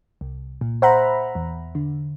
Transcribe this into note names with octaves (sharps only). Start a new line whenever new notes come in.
C2
A#2
C5 E5 F#5 A#5 B5
E2
D3